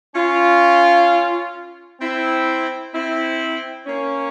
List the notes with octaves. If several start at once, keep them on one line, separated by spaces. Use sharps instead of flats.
C#4 F4
C4 E4
C4 E4
A#3 C#4